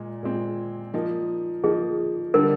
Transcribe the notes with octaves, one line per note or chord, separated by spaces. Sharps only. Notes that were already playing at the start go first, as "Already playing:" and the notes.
Already playing: A#2 G#3
A#2 G#3 C4
F3 A#3 D#4
F3 A#3 D#4 G#4
D3 G3 D4 A#4